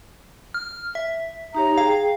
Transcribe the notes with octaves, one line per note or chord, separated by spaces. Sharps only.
F6
E5
D#4 G4 C#5 A#5
G#4 F5 G5